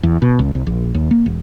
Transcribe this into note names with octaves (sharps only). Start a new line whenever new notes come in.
E2
B2
C#2
C2
A#1
D#2
A#3
E1